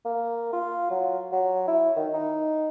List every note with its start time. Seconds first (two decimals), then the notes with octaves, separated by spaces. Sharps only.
0.05 A#3
0.53 F4
0.91 F#3
1.32 F#3
1.67 E4
1.96 D#3
2.13 D#4